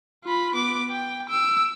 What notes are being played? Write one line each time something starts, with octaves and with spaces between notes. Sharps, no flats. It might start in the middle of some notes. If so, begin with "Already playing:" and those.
F4 B5
B3 D6
G5
E6 D7